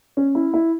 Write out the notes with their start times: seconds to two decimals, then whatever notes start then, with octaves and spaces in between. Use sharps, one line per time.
0.17 C#4
0.35 E4
0.54 E4